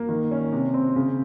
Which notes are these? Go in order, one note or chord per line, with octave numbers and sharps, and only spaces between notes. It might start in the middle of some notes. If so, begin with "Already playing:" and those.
Already playing: A#3
D#3
C#4
C3
C4
C#3